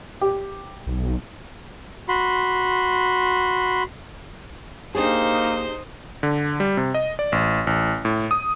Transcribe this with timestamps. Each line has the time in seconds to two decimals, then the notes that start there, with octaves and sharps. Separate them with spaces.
0.21 G4
0.87 B1
2.08 F#4 B5 C6
4.95 A#3 D4 D#4 G4 G#4 C5 D#6
6.23 D3
6.60 G3
6.77 C3
6.94 D#5
7.19 D5
7.32 A1
7.67 A1
8.05 A2
8.31 D#6